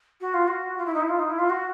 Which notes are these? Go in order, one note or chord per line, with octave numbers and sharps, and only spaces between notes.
F#4
F4
F#4
F4
E4
D#4
E4
F4
D#4
E4
F4
F#4